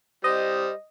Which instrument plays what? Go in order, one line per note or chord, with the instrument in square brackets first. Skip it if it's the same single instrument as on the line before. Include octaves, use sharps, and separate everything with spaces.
[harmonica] G3 C5 [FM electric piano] D#5